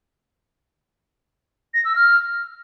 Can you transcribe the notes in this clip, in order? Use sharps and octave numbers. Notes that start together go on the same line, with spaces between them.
A#6
E6
F6